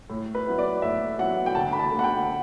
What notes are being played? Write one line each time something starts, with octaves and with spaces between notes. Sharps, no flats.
A2
B4
F#3 B3 E4
D5
A2 E5
F#3 B3 E4 F#5
G5
D2 A5
B5
A5
D3 A3
F#5
G5